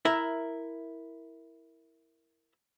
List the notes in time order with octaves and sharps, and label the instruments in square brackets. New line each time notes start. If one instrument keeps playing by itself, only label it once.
[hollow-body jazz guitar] E4 A#4 E5